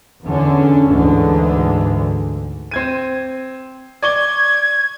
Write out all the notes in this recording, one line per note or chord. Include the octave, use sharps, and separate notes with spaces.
E2 D3 C#4
D2 G#2 D3 E3
C4 G#6 D#7
D5 C#6 G#6 G7